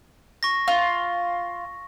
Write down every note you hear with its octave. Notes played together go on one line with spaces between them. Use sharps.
C#6 A#6
F4